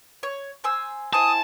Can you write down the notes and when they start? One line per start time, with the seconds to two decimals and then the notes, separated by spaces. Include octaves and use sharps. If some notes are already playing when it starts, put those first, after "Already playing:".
0.23 C#5
0.64 C5 G#5 E6
1.13 E4 C5 G#5 A5 D#6